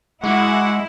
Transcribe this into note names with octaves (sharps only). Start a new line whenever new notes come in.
G#3 E4 F#4 G#4 F#5 D6